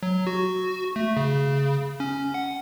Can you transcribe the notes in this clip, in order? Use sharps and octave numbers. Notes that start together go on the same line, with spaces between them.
F#3
F#4
A3
C#3
C#4
F#5